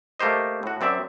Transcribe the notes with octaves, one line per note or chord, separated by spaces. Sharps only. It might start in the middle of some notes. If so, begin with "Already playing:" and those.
A3 A#3 G4 C5 D#5
A2 F#4
F#2 C4 D5 E5